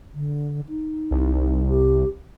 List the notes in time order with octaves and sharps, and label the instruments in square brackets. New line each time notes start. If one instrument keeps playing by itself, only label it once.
[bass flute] D3
D#4
[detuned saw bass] C2
[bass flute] G4